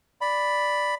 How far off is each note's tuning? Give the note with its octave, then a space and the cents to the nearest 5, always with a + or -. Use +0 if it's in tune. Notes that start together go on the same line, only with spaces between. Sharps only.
D5 +0 B5 +0